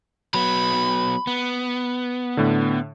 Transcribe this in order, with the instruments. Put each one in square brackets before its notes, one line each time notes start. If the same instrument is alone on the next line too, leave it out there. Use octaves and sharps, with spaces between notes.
[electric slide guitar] F#3 B3 [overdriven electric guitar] B5
[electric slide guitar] B3
[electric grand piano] A2 D3